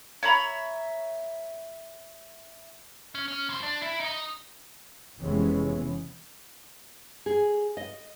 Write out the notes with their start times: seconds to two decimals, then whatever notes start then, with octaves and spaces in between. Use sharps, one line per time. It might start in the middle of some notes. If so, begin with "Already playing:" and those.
0.23 C#5 E5 A#5 B5
3.15 C#4
3.28 C#4
3.50 F#3 C5
3.63 D4
3.82 E4
4.00 D#4 D#5
5.19 F1 C3 E3 G#3 B3 C#4
7.26 G#4
7.77 D#5